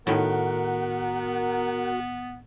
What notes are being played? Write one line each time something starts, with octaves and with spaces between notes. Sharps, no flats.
A2 D#3 B3 F#4 A#4